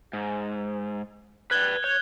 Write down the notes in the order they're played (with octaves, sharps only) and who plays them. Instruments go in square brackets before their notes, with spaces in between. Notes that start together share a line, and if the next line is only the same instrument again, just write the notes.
[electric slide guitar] G#2
[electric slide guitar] B4 C5 D5 [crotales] F#6 G#6 G7
[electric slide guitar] C#5 [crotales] G6